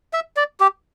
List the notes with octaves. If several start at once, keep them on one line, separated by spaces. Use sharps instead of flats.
E5
D5
G4